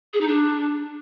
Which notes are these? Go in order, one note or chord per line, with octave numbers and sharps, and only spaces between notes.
G#4
D#4
D4